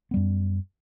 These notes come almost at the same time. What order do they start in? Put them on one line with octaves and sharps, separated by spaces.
B3 G3 F#2